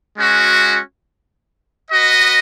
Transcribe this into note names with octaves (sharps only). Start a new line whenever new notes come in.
G#3 C#4 F#4
F#4 B4 D#5